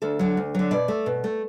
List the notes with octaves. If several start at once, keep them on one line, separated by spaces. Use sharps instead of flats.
D2 A4
D3 F#3
D2
D3 F#3
B2 D5
A3
B2
A3